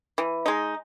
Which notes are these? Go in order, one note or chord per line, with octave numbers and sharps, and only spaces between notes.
E3
G#3 D#4